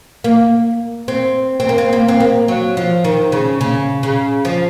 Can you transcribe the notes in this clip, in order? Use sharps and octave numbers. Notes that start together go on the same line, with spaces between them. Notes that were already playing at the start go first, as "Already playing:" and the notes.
A#3
C4
C4
A#3
C4
A#3
C4
A#3
F#3
F3
D#3
C#3
C#3
C#3
F3